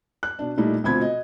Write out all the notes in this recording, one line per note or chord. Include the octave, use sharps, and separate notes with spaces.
F#6
B2 D4
A#2 G3 A3 D#4 E4
D2 B2 F3 C4 B5 G#6
D#5